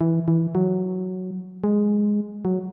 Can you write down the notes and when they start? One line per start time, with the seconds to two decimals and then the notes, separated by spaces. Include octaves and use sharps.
0.01 E3
0.28 E3
0.55 F#3
1.64 G#3
2.45 F#3